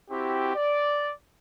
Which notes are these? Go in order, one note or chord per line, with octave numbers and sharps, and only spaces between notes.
C4 E4 F#4 G4
D5